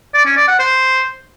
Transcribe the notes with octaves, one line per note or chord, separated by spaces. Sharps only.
D5
C#4
D5
F#5
C5